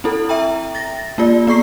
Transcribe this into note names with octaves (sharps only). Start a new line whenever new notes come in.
C4 E4 A4
E5 G5 A#5
A6 A#6
A#3 F4 D5
B3 D5 C#6 C7